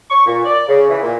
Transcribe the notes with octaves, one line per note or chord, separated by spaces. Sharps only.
C#6
A#2
D5
C#3
E3
A#2